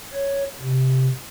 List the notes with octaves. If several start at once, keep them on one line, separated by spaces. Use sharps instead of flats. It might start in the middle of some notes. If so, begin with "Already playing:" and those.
C#5
C3